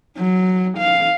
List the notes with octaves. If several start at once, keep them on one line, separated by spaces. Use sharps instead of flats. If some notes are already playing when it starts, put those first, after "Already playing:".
F#3
F5